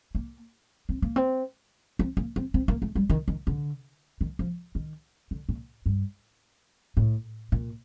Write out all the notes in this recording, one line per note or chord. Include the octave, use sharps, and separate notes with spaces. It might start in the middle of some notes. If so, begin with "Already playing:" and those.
A#3
C4
A#3
C4
C4
A#3
C4
C4
A#3
A3
G3
D#3
D#3
D3
D#3
F3
D#3
D3
A#2
G2
A2
A#2